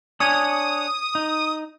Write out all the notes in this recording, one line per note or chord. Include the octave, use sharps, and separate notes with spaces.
D4 C#5 G#5 D#6
D#4